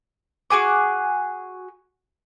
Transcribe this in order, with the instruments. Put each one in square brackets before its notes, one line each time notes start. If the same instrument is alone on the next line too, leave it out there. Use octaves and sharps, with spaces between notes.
[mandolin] F#4 G#4 G#5 D6